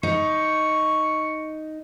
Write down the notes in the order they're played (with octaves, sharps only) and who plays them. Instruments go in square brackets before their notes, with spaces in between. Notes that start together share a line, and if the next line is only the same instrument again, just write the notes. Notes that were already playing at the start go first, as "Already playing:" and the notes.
[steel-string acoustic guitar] D#4 [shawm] C#6